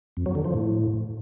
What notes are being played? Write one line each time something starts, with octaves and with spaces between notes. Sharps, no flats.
F2
F#3
D3
F3
A2